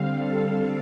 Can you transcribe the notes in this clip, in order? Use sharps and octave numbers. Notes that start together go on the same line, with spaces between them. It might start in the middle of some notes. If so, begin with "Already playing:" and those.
Already playing: D3 G3 C4 F5
A4
A4